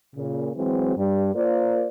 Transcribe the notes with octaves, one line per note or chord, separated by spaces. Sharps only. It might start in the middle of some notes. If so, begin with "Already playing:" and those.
A#2 C#3
E3 F#3 G#3 C4
G2 G3
A#3 F4 A#4 C5 D5